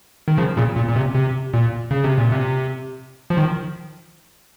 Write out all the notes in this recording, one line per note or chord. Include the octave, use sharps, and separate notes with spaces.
D#3
C#3 F3
A#2 C#3
A#2
A#2
C3
C3
A#2
C#3
C3
A#2
C3
F3
D#3